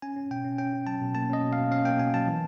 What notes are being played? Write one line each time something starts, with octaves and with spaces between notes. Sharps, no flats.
C#4 G#5
C#4
B2 G5
C#4
C#4 G5
C#4
F#3 A5
B2
A#3 A5
C#4 D#5
B2
F5
B2
C#4 F5
A#3 G5
B2 G#5
F#3 A5
E3